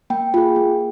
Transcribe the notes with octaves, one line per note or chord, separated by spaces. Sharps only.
A#3 G5
F4 G#4
A#3